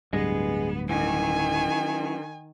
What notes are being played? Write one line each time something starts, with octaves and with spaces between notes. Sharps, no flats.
D1 D2 G2 B3 G#4 D#5 G#5
F#2 D#3 E3 G#5